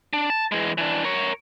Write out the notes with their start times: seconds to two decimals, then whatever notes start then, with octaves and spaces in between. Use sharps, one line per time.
0.13 D4
0.30 A5
0.52 E3 G#3
0.78 E3 D4
1.04 A#4 C#5